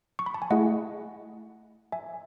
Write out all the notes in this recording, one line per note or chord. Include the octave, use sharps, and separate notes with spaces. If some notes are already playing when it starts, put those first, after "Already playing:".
C#6
B5
A5
G#5
A3 E4 G#4 D#5 F#5
E5 G#5